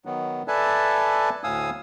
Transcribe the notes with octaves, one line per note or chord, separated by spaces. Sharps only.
D#3 F#3 B3
A4 B4 D5 E5 G#5 A5
D2 A2 F5 G#5 D#6 E6